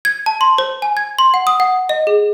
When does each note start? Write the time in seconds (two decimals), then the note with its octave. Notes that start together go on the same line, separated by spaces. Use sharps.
0.05 G#6
0.26 A5
0.41 C6
0.58 C5
0.82 G#5
0.97 G#6
1.19 C6
1.34 F#5
1.47 D#6
1.60 F#5
1.89 D#5
2.07 G#4